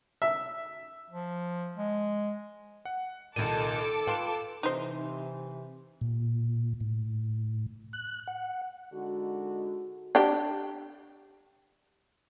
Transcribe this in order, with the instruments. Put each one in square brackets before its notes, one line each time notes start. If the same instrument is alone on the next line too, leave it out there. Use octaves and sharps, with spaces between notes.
[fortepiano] E5
[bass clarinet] F3
G#3
[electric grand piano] F#5
[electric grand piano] C2 D#7 [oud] A#2 D#3 [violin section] A4 A5 D6
[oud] F4 B4 [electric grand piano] G5 C6 E7
[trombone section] C3 E3 [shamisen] D#4 C5
[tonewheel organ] A#2
A2
F#6
F#5
[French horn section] D3 G#3 D#4 F#4
[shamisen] D4 G4